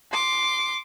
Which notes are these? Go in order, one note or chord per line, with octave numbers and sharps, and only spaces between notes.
C6 D6